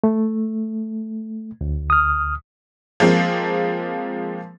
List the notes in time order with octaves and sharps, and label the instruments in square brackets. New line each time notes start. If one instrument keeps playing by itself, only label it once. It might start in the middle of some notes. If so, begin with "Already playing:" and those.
[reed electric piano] A3
D2
[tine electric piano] D#6 F6
[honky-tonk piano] F3 G#3 A#3 C4